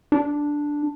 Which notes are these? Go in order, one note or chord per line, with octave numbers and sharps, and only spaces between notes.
D4